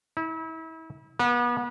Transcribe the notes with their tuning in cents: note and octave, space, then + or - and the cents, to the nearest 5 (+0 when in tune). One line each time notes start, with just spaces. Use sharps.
E4 -35
B3 -35